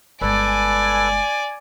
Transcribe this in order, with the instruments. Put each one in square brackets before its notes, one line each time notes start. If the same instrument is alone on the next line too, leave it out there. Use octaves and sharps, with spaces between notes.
[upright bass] G1 G#3 [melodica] A4 B4 [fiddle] D5 [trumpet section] G#5